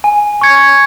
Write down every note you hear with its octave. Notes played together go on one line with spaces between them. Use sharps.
G#5
C#6 G#6 C#7